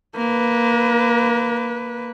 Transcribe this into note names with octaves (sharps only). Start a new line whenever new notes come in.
A#3 B4